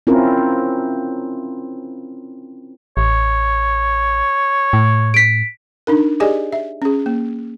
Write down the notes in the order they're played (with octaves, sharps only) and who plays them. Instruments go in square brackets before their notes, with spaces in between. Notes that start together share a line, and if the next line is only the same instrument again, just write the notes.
[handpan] C4 C#4 E4 F4 A#4
[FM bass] A1 [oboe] C#5
[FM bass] A2
[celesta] B6 D7
[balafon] D4 D#4 A#4
G4 G#4 D5 D#5 G#5
E5
C#4 G#4
A#3